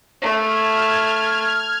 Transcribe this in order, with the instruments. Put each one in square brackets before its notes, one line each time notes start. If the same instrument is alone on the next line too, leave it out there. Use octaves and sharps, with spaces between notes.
[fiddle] A3 [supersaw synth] F6 G#6